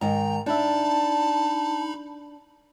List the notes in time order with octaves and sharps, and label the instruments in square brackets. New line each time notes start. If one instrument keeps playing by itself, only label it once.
[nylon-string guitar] G#2 D#3 [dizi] G5 [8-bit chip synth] A#5
[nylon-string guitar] D4 E5 [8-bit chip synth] D#4 B5 [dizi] A5